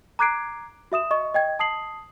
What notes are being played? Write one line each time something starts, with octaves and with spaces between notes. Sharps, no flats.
A#5 D6 F#6 G#6 C7 D7
F#4 E5 D#6 E7
D#5 C#6
D#5 G5 G#6
A5 D#6 C7 F#7